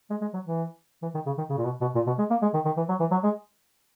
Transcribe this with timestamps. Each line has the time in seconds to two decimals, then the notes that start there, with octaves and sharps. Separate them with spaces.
0.10 G#3
0.22 G#3
0.34 F#3
0.45 E3
1.02 E3
1.15 D#3
1.26 C#3
1.38 D#3
1.49 C#3
1.58 A#2
1.65 B2
1.81 B2
1.95 A#2
2.07 B2
2.18 G#3
2.30 A#3
2.42 G#3
2.54 D#3
2.65 D#3
2.77 E3
2.89 F#3
3.00 E3
3.11 F#3
3.24 G#3